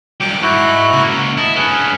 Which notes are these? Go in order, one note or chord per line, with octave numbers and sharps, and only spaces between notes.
G2 F#3 G5 D6
G#2 E4 F#4 F#6
C#2 A#3
E4 D#5 A5
G2 C#4 G#4 B4